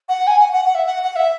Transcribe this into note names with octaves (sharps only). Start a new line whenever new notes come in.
F#5
G#5
F#5
F#5
F#5
E5
F#5
F#5
E5